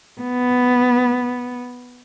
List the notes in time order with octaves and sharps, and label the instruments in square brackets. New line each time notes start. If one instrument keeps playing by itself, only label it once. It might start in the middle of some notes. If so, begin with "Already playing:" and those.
[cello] B3